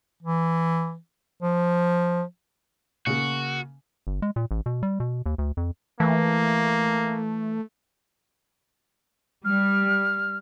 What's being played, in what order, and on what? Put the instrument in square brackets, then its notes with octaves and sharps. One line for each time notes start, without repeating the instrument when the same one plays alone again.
[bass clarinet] E3
F3
[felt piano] C#3 A#3 [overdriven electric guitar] F#4
[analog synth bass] G1
G#3
A#2
A1
B2
G3
B2
D#2
D2
F2
[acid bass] E3 [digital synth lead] A3 [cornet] A#3
[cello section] G3 [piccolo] F6